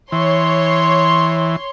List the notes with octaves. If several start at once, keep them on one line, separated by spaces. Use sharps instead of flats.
E3 C#5 C6